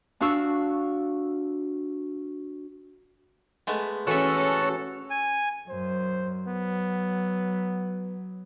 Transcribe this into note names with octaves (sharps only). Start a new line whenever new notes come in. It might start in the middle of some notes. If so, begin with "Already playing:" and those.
D4 F#4 F5 C#6 E6
G#3 A3 B3
E3 C#4 F#4 A4 C#5 E5
G#5
F#2 C5
F#3 B3